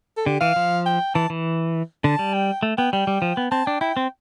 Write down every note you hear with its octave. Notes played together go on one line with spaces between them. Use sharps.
A4
D3 G4
E3 F5
F3
G5
E3 A5
E3
D3 A5
G3
G5
A3
B3 G5
G3 G5
G3
F3
B3
C4 A5
D4 G5
E4 G5
C4